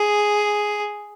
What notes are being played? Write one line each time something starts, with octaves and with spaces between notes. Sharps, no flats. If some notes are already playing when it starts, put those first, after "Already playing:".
Already playing: G#4